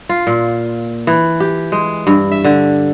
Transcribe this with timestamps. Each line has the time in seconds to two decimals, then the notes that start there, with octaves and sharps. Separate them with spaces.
0.09 F4
0.27 A#2
1.07 E3
1.40 G4
1.72 G#3
2.07 G2
2.32 E5
2.44 D3